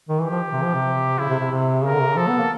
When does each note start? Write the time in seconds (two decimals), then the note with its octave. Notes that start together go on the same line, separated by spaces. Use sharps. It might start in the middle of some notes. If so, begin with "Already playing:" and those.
0.09 D#3
0.20 E3 G4
0.31 F3
0.53 C3
0.63 F3
0.74 C3
1.18 C#3 E4
1.29 C3
1.40 C3
1.51 C3
1.84 C#3 A#4
1.92 D3
2.00 C3
2.09 C#3
2.17 F3 A4
2.28 B3
2.38 A#3